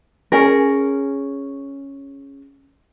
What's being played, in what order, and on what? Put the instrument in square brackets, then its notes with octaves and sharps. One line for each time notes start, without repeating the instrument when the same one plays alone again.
[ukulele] C#4 G#4 A#4